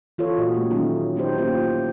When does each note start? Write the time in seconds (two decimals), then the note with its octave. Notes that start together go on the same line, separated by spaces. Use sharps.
0.18 E3 F4 A4 C#5
0.38 A#2 F#4 D#5
0.54 A3 C#4 G4
0.71 D#3 F#3 A3 C#4 D#4
1.15 F#3 B3 D#4 E4 G4 C5
1.38 A#3 C#4 F4 G4 C5